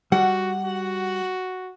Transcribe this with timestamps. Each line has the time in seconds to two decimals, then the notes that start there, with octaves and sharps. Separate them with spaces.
0.12 G3 F#4 F#5
0.64 F#4